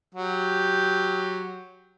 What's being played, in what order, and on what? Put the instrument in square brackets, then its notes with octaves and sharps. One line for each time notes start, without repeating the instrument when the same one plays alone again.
[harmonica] F#3 G4